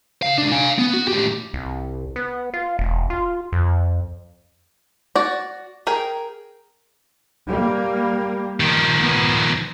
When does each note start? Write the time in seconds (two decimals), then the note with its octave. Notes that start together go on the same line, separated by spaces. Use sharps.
0.22 C#3 F5
0.38 C#2 D4
0.52 F5 G#5
0.78 B3
0.93 F#4
1.08 A2 G4
1.53 C2
2.16 B3
2.54 F4
2.79 E1
3.10 F4
3.53 F2
5.15 F#4 D5
5.87 G#4 A#4 G5
7.45 G3 A#3
8.60 D#3 F3
8.98 B3